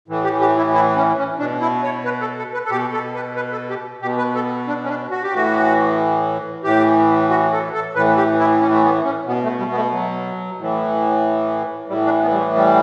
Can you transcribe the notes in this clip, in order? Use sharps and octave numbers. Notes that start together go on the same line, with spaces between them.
A2 E3
G4
G4
E4
E4
C#4
C#4
B2 D4
E4
C#5
B4
A4
A4
B4
A4
B2 G4
A4
B4
B4
A4
G4
B2 G4
B4
A4
D4
C#4
D4
F#4
G4
A2 E3 F#4
A2 E3 G4
F#4
A4
A4
A2 E3 B4
G4
E4
C#4
A3
B3
C#4
B2 B3
A3
G3
B3
A3
F#3
A2 E3
A2 E3 G3
D4
B3
G3
A3
G3